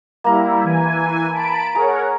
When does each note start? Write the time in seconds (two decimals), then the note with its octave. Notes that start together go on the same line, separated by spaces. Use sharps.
0.24 G3 A#3 E4 A#5
0.64 E3 G#5
1.32 A5 B5 D7
1.75 G#4 A#4 C#5 F#5 A#5